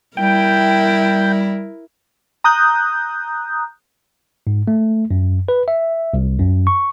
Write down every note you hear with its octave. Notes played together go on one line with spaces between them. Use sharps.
G3 E4 A#4 G5
A#5 D#6 F#6 G6
G#2
A3
F#2
B4
E5
C2
F#2
C#6